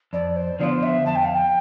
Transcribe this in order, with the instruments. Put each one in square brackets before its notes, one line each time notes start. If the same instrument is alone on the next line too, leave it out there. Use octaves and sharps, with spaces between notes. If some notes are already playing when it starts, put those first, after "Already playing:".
[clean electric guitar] F2 [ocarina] D5
[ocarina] C5
[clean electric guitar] D3 F3 B3 F4 [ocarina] C5 D5
[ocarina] E5
[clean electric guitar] F2 [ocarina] A5
[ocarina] G5
F5
G5